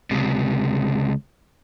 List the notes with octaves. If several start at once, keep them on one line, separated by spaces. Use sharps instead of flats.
C#2 C3